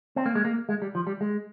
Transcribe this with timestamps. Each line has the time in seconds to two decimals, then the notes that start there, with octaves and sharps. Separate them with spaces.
0.16 C4
0.26 A#3
0.35 G#3
0.45 A#3
0.69 G#3
0.82 G3
0.95 F3
1.07 G3
1.21 G#3